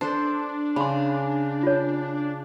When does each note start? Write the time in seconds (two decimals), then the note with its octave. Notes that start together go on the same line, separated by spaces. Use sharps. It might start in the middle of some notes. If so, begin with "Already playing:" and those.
0.01 D4 A4 C5
0.76 C#3 B5 C6
1.63 F4 C#5